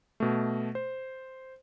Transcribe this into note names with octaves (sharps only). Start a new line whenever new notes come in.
B2 A3
C5